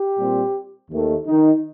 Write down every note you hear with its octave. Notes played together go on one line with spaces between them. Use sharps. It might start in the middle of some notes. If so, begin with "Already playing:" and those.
Already playing: G4
A#2 G3 C4
D#2 D#3 A3
D#3 D#4